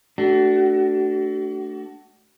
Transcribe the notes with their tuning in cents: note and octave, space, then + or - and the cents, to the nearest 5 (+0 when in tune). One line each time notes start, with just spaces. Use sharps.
A3 +0 D4 +0 F#4 +35